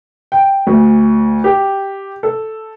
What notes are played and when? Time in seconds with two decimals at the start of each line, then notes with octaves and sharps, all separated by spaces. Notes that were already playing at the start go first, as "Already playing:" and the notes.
0.32 G5
0.67 D2
1.44 G4
2.23 A4